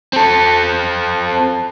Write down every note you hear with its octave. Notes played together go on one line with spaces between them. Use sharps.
C4 A4